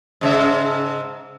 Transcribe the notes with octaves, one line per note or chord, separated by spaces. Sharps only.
G#2 C#3 E5